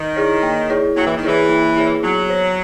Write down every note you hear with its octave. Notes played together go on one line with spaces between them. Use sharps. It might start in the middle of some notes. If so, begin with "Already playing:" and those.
Already playing: D#3
E4 G#4 C#5
A#3
E4 G#4 C#5
F#3 A#3
E3
D#3
E3 E4 G#4 C#5
A#3
E4 G#4 C#5
F#3 B3
F#4 C#5